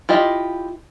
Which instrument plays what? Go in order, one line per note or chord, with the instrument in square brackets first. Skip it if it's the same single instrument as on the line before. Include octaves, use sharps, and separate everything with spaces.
[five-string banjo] E4 F4 G4 D#5